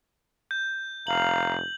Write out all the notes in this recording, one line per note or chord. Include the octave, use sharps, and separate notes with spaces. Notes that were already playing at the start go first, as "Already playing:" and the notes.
G6
F1 F5 A#5 F#7